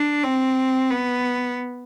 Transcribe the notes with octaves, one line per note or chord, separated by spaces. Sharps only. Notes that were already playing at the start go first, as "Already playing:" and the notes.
Already playing: D4
C4
B3